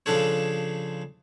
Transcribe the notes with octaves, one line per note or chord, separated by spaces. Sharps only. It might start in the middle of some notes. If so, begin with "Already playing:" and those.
C#3 F3 D4 A4 C#5